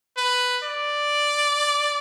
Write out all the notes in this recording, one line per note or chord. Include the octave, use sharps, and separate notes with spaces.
B4
D5